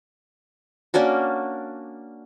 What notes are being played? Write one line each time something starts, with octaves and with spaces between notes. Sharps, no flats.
A#3 C#4 D4 F#4